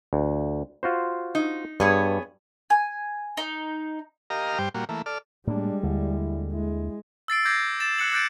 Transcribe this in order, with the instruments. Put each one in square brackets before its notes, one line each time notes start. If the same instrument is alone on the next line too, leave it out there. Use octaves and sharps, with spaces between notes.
[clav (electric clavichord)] D2
F4 F#4 C5
[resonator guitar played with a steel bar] D#4
[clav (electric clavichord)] G2 [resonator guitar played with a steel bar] B3 G#4 C#5
[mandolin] G#5
D#4
[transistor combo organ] G4 A#4 D#5 F5 A#5
G2 G3 C5 G5
A#2 G3 A#3 F#4
E3 A3 A#3
A4 D5 F6
[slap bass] A2 A#3 [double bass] G3 G#3 [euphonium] D4
[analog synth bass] D#2 [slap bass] D3 [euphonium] E4
[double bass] G#3 [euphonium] E4
[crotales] E6 A6 C7 D7
D6 G6 G#6 A#6 C7
A6 E7
E6 F#6 C#7 F#7
D6 F#6 G6 A6 D7